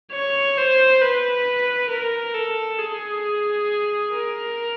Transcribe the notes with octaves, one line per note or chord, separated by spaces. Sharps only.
C#5
C5
B4
A#4
A4
G#4
A#4